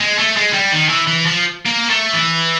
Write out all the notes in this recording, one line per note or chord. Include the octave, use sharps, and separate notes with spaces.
G#3
A3
G#3
G3
D#3
E3
E3
F3
A#3
A3
E3